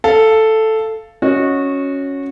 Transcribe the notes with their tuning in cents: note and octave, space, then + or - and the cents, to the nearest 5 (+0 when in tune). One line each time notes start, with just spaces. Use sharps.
A4 +0 F5 -15
C#4 +0 F#4 -15 D#5 +0